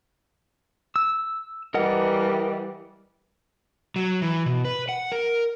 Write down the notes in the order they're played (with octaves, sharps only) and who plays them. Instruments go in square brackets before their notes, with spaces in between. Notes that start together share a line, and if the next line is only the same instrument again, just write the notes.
[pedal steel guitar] E6
[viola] E3 G3 [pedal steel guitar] A#4 D#5 F#5
[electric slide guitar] F#3
E3
B2
B4
F#5
A#4